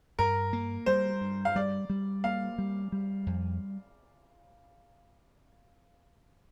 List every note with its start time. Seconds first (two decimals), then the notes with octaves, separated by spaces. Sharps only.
0.19 G2 A#4
0.53 A#3
0.86 G3 C5
1.21 G2
1.45 F5
1.55 G3 D5
1.90 G3
2.24 A#3 F5
2.58 G3
2.92 G3
3.26 F2